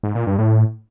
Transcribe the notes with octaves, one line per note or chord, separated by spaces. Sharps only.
G#2
A#2
G2
A2